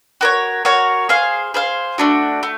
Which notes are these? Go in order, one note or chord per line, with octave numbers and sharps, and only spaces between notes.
F#4 A#4 C#5
F#4 A#4 C#5
G#4 C5 F5
G#4 C5 F5
A3 D4 F#4
A3